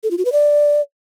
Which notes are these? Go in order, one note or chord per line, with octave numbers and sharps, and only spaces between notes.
A4
F4
F#4
B4
D5